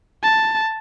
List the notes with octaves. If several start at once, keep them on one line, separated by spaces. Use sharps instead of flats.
A5